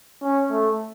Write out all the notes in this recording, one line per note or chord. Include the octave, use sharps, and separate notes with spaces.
C#4
A3